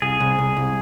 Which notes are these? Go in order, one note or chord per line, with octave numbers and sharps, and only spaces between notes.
C2 G#4
C2
C2
C2